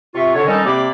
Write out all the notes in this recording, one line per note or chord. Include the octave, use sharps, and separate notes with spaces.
C3 F4 E5 C#6
D3 C#5
D#3 G3 C#4 D#4 A4 D#5
C3 A#3 D5 B5 D6